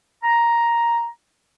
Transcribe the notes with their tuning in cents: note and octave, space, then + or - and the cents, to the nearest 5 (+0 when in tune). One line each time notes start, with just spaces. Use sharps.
A#5 +5